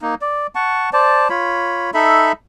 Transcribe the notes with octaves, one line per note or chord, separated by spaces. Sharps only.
A#3 D#4
D5
F#5 A5 C#6
C5 D5 A5
F4 C#5 B5
D#4 A4 E5 B5